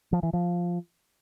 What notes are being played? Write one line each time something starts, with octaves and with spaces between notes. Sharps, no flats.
F3
E3
F3